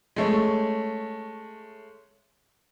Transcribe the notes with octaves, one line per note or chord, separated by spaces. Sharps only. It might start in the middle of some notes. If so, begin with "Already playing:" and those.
G#3 A3 C#4